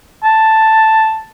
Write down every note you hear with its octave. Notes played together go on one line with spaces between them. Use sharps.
A5